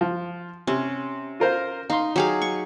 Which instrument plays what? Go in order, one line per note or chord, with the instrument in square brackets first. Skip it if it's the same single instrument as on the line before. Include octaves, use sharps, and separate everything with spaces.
[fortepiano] F3
[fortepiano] C3 [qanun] C#4
[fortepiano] F4 A#4 C5
[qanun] D#4 [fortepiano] F5 C6
[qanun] F#3 G#4 F5 [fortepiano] G4
[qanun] C#6